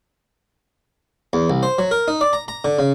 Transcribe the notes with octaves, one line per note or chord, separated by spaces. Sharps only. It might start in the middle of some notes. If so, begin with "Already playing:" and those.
E2
C2
C5
F#3
A#4
D#4
D5
A#5
A#5
D3
C#3